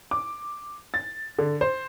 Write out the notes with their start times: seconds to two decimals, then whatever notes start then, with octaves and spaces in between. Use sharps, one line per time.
0.11 D6
0.94 A6
1.39 D3
1.61 C5